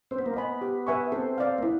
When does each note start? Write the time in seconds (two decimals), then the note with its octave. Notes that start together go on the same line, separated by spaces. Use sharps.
0.11 C4 C5
0.19 B3
0.26 A#3
0.34 B3 D#5 G#5 B5
0.61 G4
0.87 B4 E5 G#5 C#6
1.12 C4 A4
1.38 D5 F5
1.58 A#3
1.63 B3 E4